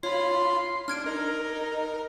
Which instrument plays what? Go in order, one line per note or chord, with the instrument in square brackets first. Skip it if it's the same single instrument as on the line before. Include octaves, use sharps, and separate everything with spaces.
[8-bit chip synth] F4 B5 [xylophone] C#5 [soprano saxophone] C6
[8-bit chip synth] D4 [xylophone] F6 G#6 D7
[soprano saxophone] D#4 [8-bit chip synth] A#4